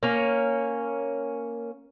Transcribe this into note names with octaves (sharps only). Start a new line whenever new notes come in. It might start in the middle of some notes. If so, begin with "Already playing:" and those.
A#3 C#4